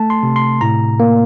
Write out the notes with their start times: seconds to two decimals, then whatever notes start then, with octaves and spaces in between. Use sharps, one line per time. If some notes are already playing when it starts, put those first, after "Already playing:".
Already playing: A3 A5
0.10 C6
0.23 C3
0.36 C6
0.61 A2 A#5
1.00 A#3